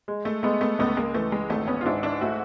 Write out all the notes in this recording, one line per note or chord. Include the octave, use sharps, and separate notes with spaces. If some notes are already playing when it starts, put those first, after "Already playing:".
G#3
A3
G#3 A3 B3
A3 B3
C#2 A3 B3
G#3 A#3
E3 A3
G#3
G#1 A3
B3 C#4
F4
G#2 D4 E4
D4 E4
A3 E4 F#4